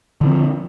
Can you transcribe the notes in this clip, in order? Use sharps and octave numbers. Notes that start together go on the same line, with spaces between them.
D3 E3 F3 C4